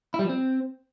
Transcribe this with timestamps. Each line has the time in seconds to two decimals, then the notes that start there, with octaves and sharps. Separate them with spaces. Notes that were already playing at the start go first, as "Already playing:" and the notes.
0.14 E4
0.19 G3
0.24 F3
0.29 C4